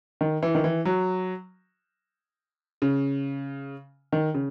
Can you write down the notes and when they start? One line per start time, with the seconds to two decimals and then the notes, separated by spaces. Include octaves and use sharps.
0.21 D#3
0.43 E3
0.55 D#3
0.64 E3
0.85 F#3
2.82 C#3
4.12 D#3
4.34 C#3